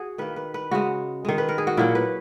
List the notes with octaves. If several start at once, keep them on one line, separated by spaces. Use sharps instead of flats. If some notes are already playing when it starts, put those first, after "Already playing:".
Already playing: F#4 G#4
D#3 A#3 B4
B4
B4
C#3 G#3 F#4
D#3 G#3
B4
A#4
G#4
F#4
A#2 F#3 A#3 E4
B4